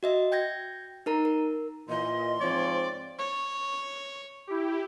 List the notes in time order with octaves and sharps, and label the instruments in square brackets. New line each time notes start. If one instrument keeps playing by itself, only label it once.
[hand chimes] F#4 D#5 E5
G5 G6 G#6 A#6
D#4 A#4 A#5
A#4
[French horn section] A#2 E3 [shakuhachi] D#5 [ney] C6
[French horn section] G#2 F3 C4 [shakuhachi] C#5 [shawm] D5
[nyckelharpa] C#5
[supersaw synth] E4 G4